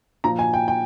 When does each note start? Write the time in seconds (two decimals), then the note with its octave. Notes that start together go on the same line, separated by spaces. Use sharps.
0.24 A#2 F3 A#5
0.39 G#5
0.54 G5
0.68 G5